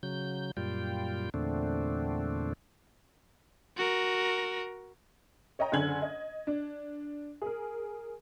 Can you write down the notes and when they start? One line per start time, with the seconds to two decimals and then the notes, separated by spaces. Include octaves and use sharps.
0.03 C#3 F#3 G6
0.57 F#2 A#2 G3 F4 G5
1.34 E2 A#2 D3 A3 C4 D4
3.77 F#4 A#4
5.59 C#5 D#5 G5 A#5
5.72 F#1 D3 G#5 G#6 F#7
6.02 D#5
6.47 D4
7.42 G#4 A#4